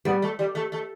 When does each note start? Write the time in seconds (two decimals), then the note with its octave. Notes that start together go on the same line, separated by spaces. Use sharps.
0.05 G3 B3
0.22 A3
0.39 G3
0.55 A3
0.72 A3